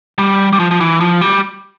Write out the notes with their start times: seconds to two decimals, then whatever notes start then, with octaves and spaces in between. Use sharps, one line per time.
0.19 G3
0.53 G3
0.59 F3
0.71 F3
0.81 E3
1.01 F3
1.21 G3